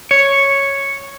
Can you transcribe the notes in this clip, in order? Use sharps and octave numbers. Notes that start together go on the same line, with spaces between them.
C#5